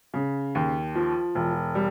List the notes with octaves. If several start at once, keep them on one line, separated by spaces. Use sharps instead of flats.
C#3
D#2
F3
E1
G3